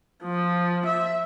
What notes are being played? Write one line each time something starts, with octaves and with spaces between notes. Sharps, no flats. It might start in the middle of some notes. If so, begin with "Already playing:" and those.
F3
E5